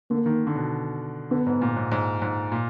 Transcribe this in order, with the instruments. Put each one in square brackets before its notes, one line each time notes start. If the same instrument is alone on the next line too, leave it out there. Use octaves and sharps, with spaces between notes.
[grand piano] D3 [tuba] A#3
[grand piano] D#3
D3
B2
[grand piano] D3 [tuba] B3
[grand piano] G#2
A#2
G#2
G#2
G#2
A#2